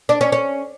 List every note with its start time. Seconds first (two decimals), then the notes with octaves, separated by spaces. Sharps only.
0.09 D4
0.21 C#4
0.32 C#4